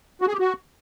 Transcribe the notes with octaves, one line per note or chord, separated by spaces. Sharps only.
F#4
G#4
G4
F#4